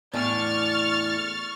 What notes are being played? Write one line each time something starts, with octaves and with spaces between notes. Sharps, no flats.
E2 A2 D4 C#6 F6 A6